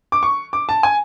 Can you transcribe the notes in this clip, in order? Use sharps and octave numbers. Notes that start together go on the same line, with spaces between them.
D6
C#6
D6
A5
G#5